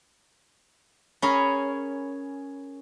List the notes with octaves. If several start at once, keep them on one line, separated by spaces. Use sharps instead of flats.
C#4 G#4 A#4 C#5 G#5 B5